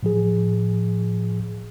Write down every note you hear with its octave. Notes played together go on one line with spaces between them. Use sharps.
A2 F3 G#4